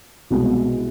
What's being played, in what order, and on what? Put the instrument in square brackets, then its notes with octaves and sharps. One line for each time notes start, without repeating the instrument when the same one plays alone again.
[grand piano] C2 B2 G#3